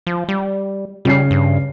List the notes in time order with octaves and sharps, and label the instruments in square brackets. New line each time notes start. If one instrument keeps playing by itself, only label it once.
[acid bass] F3
G3
[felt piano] C#3 C#4 C7 [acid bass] G3
[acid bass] G2